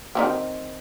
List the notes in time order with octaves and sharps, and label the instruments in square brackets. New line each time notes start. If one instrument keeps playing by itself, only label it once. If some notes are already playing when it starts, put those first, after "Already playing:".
[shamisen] D#3 E3 C4